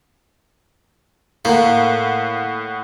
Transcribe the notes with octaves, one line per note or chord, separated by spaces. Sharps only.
A2 A#3 F#5